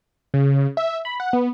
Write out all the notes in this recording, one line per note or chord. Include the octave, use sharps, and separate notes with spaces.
C#3
E5
B5
F#5
B3